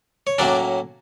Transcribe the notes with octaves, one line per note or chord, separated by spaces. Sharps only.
C#5
A2 F#3 A#3 C#4 D4 D5